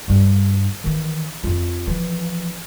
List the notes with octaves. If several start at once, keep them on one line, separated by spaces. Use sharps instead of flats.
G2 G3
D#3 E3
F2 F4
E3 F3